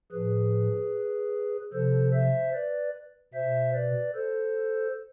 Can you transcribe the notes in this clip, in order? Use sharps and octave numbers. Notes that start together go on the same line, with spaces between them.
A2 F3 G#4 B4
C3 F3 A4 C5
C5 E5
B4 D5
B2 C5 E5
B4 D5
A4 C5